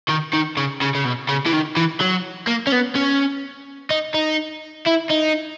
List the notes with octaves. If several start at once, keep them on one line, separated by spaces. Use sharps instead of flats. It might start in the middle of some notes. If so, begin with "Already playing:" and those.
D#3
D#3
C#3
C#3
C#3
B2
C#3
E3
D#3
E3
F#3
A#3
C#4
B3
C#4
D#4
D#4
E4
D#4